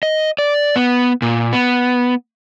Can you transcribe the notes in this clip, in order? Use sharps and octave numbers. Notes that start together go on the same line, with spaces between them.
D#5
D5
B3
A#2
B3